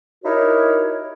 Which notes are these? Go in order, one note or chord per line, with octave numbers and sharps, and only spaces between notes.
D#4 E4 F#4 G4 A#4 C#5